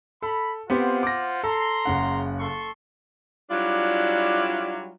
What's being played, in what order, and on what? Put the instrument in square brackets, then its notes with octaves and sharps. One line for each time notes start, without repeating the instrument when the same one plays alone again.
[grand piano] A4 [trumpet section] B5
[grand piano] B3 C4 G4 [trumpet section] F4 C5 F#5
[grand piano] D6 A#6
[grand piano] A4 [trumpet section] A#5 C6
[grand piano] F#1 C#3 F#5
[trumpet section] A4 C6 C#6
[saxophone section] F#3 G3 D4 E4 F4